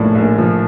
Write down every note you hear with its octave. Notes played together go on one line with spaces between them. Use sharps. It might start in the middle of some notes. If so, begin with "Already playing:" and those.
Already playing: A#1 A2 F3 D5
A#1
F3